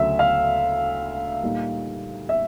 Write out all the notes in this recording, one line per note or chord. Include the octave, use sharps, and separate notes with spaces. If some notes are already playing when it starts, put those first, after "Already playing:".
Already playing: D2 C#3 F#3 E5
F5
A#2 G3 A#3 D#4
E5